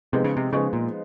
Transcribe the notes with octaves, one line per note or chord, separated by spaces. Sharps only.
C3 F3 G#3 B3 D#4
C#3
C3
C#3 F3 G#3 B3 D#4
A#2